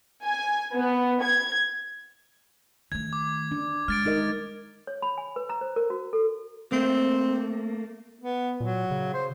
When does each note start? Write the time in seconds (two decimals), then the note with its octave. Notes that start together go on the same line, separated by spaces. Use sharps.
0.24 G#5
0.74 B3
1.23 G#6
2.92 D#3 A3 G#6
3.13 D6
3.51 D4
3.88 G#3 F6 A6 D7
4.06 D#4 A#4 D#5
4.87 C#5
5.02 B5
5.18 G#5
5.36 B4
5.50 A#5
5.61 C5
5.76 A#4
5.90 F#4
6.13 A4
6.72 A3 A#3 C4
8.21 B3
8.60 A#2 F#3
8.91 C#3
9.14 C5